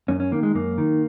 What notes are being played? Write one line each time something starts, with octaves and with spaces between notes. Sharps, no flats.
F#2 C#4
C#4
D#3 A#3
G#3
F#2 A#3
D#3